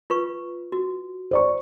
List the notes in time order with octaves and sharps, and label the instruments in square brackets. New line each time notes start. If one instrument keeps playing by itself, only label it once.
[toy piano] F4 B4 C#6
F#4
[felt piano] C5 D5 C#6